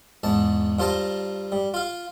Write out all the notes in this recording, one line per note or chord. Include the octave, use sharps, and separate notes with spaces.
E2 G#2 A5
G2 F4 C5 A5 A#5
G3
F4 F5